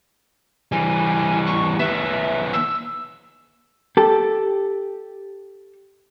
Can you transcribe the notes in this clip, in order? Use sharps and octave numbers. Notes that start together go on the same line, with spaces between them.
E3 G3 G#5
C#6
D#3 B3 E5
E6
G4 A4